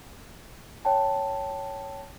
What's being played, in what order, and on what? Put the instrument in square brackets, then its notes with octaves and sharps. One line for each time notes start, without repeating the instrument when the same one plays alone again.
[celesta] C#5 G5 A5